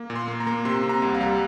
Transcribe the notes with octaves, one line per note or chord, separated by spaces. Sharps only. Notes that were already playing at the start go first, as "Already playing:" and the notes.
Already playing: A#3
A#2
C6
A#3
A#5
A#3
C3 C6
C3
A#5
C2
F5
G3